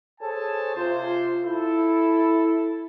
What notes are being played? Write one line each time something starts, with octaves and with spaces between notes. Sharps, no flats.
G#4 A4 C5 C#5 G#5 A5
C3 F4 C5
E4 A4